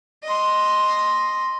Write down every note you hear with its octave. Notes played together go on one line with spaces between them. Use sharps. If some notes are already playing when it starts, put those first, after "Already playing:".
D#5 C6